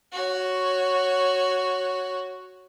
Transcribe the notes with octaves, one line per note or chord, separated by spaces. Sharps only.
F#4 C#5